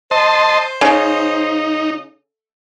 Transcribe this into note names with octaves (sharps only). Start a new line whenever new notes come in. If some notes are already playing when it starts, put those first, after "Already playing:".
C5 D#5 A5 C6
C#3 D#4